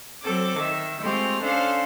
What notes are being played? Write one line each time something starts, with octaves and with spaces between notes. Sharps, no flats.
F#3 C4 A4 D6
D#3 E5
G#3 A3 C4 F4 G4
C#4 D4 A4 C5 F5